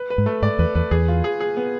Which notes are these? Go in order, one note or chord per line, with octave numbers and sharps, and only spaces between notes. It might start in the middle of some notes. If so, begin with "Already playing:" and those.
Already playing: B4
B4
G#2
A3
G#2 D5
E2 B4
E2 B4
E2 G#4
F4
G#4
G#4
B3